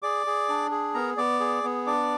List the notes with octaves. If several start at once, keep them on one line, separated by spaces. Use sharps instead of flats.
G#4 D5 D6
G#4
D4
G#4
B3 A#4 A#5
B3 D5 D6
G#4
B3
D4 D5 D6